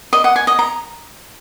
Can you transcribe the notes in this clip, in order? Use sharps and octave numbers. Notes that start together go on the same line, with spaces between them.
D#5
F#5
G#5
D#5
A#5